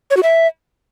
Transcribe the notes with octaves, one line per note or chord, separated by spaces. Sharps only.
C#5
F#4
E5